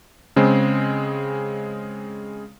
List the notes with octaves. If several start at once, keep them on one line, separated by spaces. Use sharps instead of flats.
C#3 G#3 C4